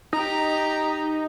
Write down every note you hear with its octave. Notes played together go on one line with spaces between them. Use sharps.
D#4 G4 A#5